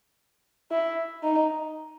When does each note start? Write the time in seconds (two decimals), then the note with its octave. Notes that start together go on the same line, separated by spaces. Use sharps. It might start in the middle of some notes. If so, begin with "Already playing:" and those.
0.71 E4
1.23 D#4